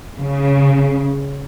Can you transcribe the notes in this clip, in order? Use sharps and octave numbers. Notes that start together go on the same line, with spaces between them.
C#3